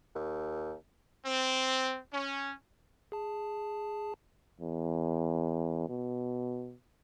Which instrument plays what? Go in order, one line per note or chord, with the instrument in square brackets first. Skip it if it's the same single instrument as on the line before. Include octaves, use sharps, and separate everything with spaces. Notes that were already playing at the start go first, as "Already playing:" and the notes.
[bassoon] D#2
[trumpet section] C4
C#4
[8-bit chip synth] G#4 A5
[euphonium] E2
B2